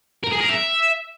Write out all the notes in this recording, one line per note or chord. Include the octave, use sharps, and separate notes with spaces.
A#4
G#4
A#4
E5